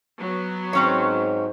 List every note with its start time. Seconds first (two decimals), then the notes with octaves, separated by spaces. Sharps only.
0.19 F#3 B3
0.73 G#2 C4 C#4 C#5